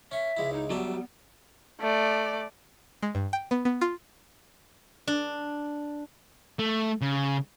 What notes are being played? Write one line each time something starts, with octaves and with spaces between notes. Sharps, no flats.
C#4 E5 C#6
C#2 G#3 E4
D#4
F#3 G3 B3 D4 E5
A3 D5
G#3
G2
G5
B3
B3
F4
D4
A3
C#3